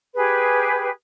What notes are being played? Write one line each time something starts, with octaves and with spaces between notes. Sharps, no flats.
G4 G#4 B4